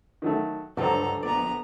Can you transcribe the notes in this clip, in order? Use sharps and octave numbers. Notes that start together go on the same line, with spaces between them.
D#3 F#3 A3
C#2 G2 D3 F#3 A4 C5 A#5
A#1 B3 D5 A#5